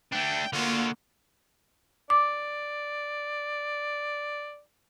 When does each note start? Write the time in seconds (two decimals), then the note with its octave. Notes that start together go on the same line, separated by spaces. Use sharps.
0.12 A3 D4 G5
0.53 D3 A#3 F4 F#4
2.10 D5 D6